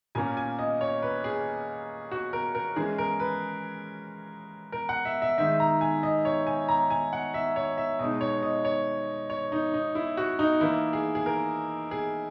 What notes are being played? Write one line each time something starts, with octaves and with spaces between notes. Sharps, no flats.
A#2 A#3 C#4 G#5
G#5
D#5
C#5
B4
G#4
F#4
A#4
A#4
E3 G#3 C#4 G#4
A#4
B4
A#4
F#5
E5
E5
D#3 G#3 D#4 E5
A#5
G#5
D#5
C#5
G#5
A#5
G#5
F#5
E5
C#5
E5
B2 G#3 D#4 D#5
C#5
D#5
C#5
C#5
D#4
D#4
E4
F#4
D#4
E3 A#3 D#4 E4
G#4
G#4
A#4
G#4